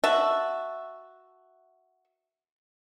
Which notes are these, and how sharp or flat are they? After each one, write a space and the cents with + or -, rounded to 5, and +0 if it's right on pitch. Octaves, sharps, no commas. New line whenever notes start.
F#4 +0 E5 +0 A5 +0